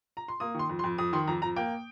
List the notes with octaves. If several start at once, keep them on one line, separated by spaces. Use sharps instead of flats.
A#5
C6
A#3 D#6
D#3 C6
F2
C6
F2
F2 D#6
D#3 C6
F2 A#5
F2 A#5
A#3 G5